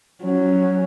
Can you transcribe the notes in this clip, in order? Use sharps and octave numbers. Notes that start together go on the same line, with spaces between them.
F#3 C#4